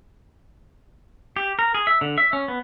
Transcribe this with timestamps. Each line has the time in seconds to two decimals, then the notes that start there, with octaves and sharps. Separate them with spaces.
1.36 G4
1.59 A#4
1.75 G#4
1.87 E5
2.01 D3
2.18 E5
2.33 C#4
2.48 B3